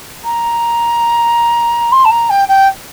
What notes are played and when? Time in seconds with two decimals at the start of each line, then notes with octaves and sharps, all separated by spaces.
0.24 A#5
1.92 C6
2.05 A5
2.11 A#5
2.30 G5
2.48 G5